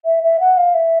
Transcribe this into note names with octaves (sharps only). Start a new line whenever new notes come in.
E5
E5
F#5
F5
E5